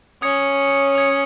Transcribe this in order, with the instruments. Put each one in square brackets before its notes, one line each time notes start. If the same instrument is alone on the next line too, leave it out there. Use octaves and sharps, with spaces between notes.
[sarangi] C#4 [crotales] D#6 G#6 C#7
[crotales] D#6 G#6 C#7